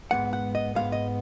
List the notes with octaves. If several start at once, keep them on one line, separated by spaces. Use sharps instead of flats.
G#2 F3 G#3 B3 F#5
F#5
D#5
G#2 F3 G#3 B3 F5
D#5